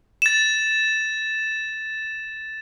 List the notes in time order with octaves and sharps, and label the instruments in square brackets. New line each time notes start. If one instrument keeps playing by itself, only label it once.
[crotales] A6 E7